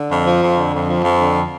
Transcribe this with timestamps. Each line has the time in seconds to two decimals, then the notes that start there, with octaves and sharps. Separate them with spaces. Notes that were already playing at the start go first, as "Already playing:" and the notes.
Already playing: D3
0.10 F2
0.26 F3
0.41 F2
0.57 D3
0.73 F2
0.89 F3
1.04 F2
1.20 D3